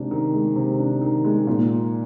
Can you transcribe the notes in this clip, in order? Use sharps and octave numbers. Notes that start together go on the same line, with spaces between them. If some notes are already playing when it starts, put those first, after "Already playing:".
Already playing: C3 D#3 G#3 D4
D#3
G#3
C3
D4
D#3
G#3
A#2